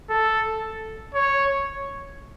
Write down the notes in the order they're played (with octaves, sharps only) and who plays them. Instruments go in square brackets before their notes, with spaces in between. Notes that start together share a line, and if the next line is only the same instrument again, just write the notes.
[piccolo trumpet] A4
C#5